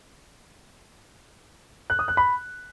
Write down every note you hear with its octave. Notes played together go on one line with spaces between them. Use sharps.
F#6
D#6
F#6
B5